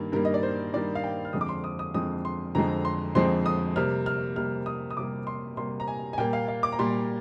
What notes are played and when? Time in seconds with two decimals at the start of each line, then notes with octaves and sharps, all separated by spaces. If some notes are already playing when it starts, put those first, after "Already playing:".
Already playing: G2 D#3 G3 A#3
0.12 G2 D#3 G3 A#3 A#4
0.25 D#5
0.34 D5
0.43 C5
0.73 G2 D#3 G3 A#3 D5
0.95 F5
1.04 G5
1.25 F6
1.33 F2 D3 F3 G#3 C4 D#6
1.41 D6
1.49 C6
1.64 D#6
1.79 D#6
1.94 F2 D3 F3 G#3 C4 D#6
2.25 C6
2.55 F2 D3 F3 G#3 C4 A#5
2.85 C6
3.15 F2 D3 F3 G#3 C4 C6
3.46 D#6
3.76 C3 G3 A#3 F6
4.06 F6
4.36 C3 G3 A#3 F6
4.66 D#6
4.91 D#6
4.97 C3 G3 A#3 D6
5.27 C6
5.57 C3 G3 A#3 C6
5.80 A#5
5.88 G#5
6.13 G#5
6.18 A#2 G3 A#3 G5
6.33 F5
6.48 F5
6.63 D6
6.72 A#5
6.79 A#2 G3 A#3 C6